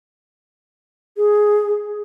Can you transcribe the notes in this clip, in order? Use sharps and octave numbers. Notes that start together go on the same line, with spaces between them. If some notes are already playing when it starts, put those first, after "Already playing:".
G#4